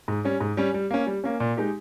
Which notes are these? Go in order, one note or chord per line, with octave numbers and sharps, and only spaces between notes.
G#2
G3 C#4
G#2
G3 C#4
G3
A#3 C#4
G3
A#3 C#4
A#2
G#3 D#4 G4